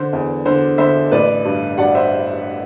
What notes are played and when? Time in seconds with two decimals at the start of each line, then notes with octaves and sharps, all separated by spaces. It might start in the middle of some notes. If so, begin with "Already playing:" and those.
Already playing: D3 C5
0.13 E2
0.46 D3 C5
0.78 D3 C5 E5
1.11 A1 B4 D5
1.45 G2
1.78 G2 D5 F#5
1.95 C5 E5